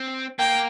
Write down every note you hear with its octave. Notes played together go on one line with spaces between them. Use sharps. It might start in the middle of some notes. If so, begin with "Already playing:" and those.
Already playing: C4
A#3 G5